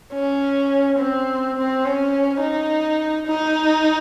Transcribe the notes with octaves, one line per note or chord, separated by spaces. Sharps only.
C#4
C4
C4
C#4
D#4
D#4